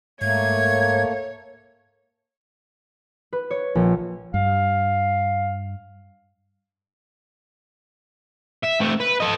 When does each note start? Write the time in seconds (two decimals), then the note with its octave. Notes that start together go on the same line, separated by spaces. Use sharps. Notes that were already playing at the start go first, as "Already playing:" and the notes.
0.21 G#2 A3 A#3 C#5 G#6
3.33 B4
3.50 C#5
3.75 A#1
4.34 G2 F5
8.63 E5
8.80 A3 C4
9.00 B4
9.20 A4 D#5